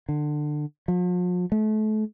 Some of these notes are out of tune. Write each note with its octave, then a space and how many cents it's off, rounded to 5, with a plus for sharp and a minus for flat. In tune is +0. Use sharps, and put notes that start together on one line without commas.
D3 +25
F3 +45
A3 -35